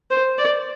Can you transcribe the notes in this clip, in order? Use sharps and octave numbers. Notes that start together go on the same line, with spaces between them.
C5
D5